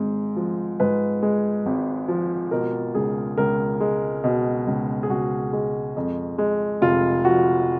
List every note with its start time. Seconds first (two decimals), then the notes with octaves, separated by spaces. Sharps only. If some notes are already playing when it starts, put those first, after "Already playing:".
Already playing: G#1 G#2 G#3
0.36 F3
0.80 G#2 B4
1.23 G#3
1.66 G#1
2.08 F3
2.51 B2 A#4
2.95 C#2 G#4
3.38 C#2 A#4
3.81 G#3
4.24 B2
4.67 C#2
5.03 G#4
5.10 C#2 F#4
5.53 G#3
5.96 F2
6.38 G#3
6.82 F1 F4
7.25 F3 F#4